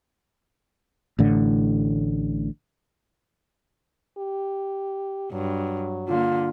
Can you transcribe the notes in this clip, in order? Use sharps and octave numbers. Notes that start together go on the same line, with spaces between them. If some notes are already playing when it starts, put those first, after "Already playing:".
A1 A2 D3
G4
G2 F#3
D3 A#3 F4